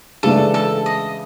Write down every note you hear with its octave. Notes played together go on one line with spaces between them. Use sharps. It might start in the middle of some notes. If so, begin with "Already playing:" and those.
C#2 C#3 E3 A3 D4 A4
A4
D#5